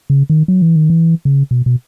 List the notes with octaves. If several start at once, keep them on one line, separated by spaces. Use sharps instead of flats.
C#3
D#3
F#3
E3
D#3
E3
C#3
B2
B2